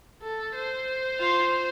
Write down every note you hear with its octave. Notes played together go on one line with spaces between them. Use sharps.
A4
C5
F4